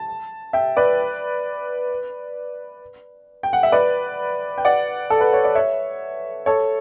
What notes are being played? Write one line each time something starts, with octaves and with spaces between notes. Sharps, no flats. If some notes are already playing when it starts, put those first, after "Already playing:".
Already playing: A5
E5 G5
B4 D5
G5
F#5
E5
B4 D5
G5
D5 F#5
A4
B4
C#5
D5
C#5 E5
A4 C#5